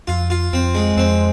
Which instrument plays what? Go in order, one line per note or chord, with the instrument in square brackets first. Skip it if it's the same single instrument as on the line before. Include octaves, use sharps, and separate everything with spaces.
[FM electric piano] F2 [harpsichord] F4
[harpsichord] F4
[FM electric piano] F2 [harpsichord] C4
[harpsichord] G#3
[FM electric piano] F2 [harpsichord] C4